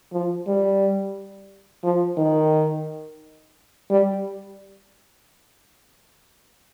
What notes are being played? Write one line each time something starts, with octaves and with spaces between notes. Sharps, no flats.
F3
G3
F3
D#3
G3